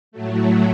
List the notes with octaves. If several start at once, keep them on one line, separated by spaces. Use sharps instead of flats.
A2 F#3 A3